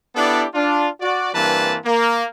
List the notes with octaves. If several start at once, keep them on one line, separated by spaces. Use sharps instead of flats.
B3 D4 E4 G4 A4 D5
D4 F4
F#4 D5
G2 E3 A#3 C4 B4 A5
A#3